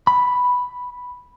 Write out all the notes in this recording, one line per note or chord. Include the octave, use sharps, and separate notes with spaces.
B5